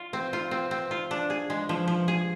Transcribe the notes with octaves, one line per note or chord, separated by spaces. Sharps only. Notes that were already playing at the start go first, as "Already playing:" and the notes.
Already playing: F4
C4
F4
C4
C4
F4
D4
G#4
G#3
F3
F3
G#4